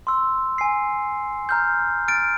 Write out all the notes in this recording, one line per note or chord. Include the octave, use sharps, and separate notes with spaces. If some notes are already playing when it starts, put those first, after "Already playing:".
C6 E6
G#5 C7
A#5 F6 G6
F6 A6 D7